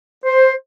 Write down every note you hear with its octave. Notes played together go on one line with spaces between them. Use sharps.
C5